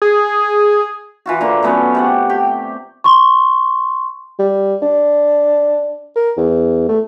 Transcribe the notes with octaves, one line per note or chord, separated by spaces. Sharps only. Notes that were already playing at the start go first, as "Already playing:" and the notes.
G#4
E3 F4 F#4
D3 A#3
F#3 A3 B3 C#4
C3 D5 F#5
G4
C6 C#6
G3
D4
A#4
E2
A3